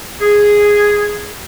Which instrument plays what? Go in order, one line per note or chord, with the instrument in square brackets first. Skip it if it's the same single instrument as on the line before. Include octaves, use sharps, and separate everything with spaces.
[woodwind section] G#4